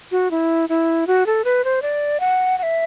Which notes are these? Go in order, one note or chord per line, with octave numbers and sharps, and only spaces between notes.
F#4
E4
E4
F#4
A4
B4
C5
D5
F#5
F#5
E5